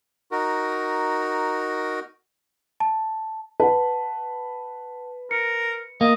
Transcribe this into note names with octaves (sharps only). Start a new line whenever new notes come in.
D#4 F#4 A#4
A5
B4 F#5 A5
A#4 C#7
A#3 D#5